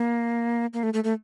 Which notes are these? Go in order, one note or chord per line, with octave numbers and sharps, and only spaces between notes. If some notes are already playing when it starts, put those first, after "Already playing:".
Already playing: A#3
A#3
A3
A3
A3